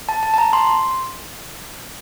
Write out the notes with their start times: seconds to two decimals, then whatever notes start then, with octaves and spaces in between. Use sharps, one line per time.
0.09 A5
0.23 A5
0.34 A5
0.38 A#5
0.53 C6